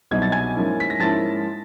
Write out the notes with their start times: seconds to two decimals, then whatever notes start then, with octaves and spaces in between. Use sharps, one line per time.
0.11 C2 B2 F#3 B3 D#4 G#6
0.22 A6
0.32 G#5 G#6
0.56 G#2 F3 A#3 C#4 E4
0.80 B6
0.90 A#6
1.00 G#2 F3 A#3 C#4 E4 A5 A6